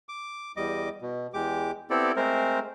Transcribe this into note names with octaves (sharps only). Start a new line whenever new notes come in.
D6
E2 G3 D#5 D6
B2
E2 G#3 G4 D6
B3 C4 E4 G4 A4 D5
G#3 A3 C4 A#4 C5